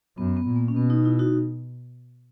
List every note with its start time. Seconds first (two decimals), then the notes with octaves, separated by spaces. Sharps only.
0.18 F#2 B3
0.37 B3
0.46 A#2
0.56 A#3
0.68 C#4
0.75 B2 B3
0.90 D#4
1.05 E4
1.19 D#4 F#4